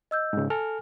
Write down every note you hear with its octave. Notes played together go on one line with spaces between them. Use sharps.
D#5 E6 G6
G#2 C#3
A4 G#5 F6